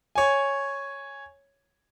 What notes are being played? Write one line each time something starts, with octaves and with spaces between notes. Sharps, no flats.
C#5 G#5